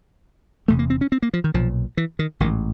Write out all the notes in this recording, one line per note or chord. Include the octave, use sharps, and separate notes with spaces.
E1 E2 C3 A3
A#3
C4
C#4
C4
A#3
F3
D#3
B1 A#2 F3
E3
D#3
A1 G#2 D#3